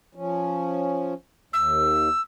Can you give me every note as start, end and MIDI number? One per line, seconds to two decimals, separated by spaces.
0.15 1.14 53
0.15 1.14 61
1.53 2.09 39
1.53 2.21 88